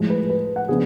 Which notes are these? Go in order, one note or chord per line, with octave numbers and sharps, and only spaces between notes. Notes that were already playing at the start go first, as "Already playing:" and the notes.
Already playing: A2 F3 G#3
B4
B4
F#5
C#3 F3 B3 D4 G#4